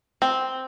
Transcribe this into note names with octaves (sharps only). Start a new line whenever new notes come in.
C4